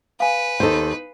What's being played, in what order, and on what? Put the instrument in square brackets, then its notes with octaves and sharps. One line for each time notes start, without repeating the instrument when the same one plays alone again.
[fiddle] B4 [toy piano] F5 G#5
[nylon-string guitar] D#2 A4 [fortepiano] D#4 C5